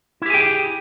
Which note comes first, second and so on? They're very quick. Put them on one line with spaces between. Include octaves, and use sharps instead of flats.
E4 G4 G#4 G5